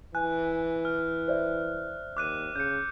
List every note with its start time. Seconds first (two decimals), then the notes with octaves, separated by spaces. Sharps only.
0.15 E3 G#5 F#6
0.85 F6
1.28 C5 D5 E5
2.17 D#2 D6 F#6 D#7
2.55 C#3 G6 C#7